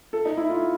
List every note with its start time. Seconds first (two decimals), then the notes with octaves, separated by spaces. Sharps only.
0.13 A4
0.25 D#4
0.38 E4
0.50 F4